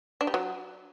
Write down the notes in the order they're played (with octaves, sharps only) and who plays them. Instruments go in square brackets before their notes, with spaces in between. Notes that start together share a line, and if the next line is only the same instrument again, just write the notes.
[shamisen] D4
G3
F#3